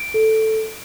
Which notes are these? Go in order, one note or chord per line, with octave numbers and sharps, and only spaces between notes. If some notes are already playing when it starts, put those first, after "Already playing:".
Already playing: D7
A4